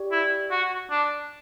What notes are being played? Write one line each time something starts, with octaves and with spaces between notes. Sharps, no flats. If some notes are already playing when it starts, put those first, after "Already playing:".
Already playing: G4 D5
E4
F#4
D4